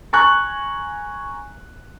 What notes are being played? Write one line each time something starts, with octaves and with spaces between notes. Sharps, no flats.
G#5 A#5 C#6 F#6